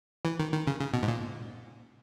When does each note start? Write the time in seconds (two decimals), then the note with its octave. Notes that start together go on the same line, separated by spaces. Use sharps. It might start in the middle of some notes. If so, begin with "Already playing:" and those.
0.25 E3
0.40 D#3
0.52 D#3
0.67 C#3
0.80 C#3
0.94 B2
1.03 G#2
1.08 A#2